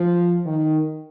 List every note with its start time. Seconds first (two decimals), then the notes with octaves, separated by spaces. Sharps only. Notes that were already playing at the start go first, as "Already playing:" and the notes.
Already playing: F3
0.46 D#3